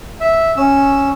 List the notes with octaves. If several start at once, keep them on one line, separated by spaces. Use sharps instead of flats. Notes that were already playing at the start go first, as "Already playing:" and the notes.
E5
C#4 E6